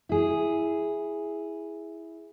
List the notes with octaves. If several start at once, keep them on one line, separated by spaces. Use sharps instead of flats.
E4 G#4